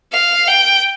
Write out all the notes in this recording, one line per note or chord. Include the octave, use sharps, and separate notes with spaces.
F5
G5